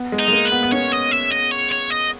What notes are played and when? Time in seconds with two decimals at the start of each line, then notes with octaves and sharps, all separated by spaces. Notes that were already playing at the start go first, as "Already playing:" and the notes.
Already playing: B3
0.12 G#3
0.19 D#4
0.28 G#3
0.32 A#3
0.45 B4
0.52 B3
0.63 B3
0.72 C#4 C#5
0.92 D#5
1.11 E5
1.31 D#5
1.51 C#5
1.71 C#5
1.90 D#5